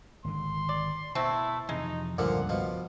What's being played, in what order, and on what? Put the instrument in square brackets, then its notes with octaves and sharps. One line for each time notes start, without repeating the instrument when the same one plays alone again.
[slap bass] G#1 D3 [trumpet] C6
[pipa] D5
[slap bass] B2 [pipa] A3 C4 [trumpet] E4
[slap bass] F2 C3 E3 [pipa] G#3 [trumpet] D#4
[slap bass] C#2 G2 [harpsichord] A#2 D3 F3 [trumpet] F#5
[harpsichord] B2 F3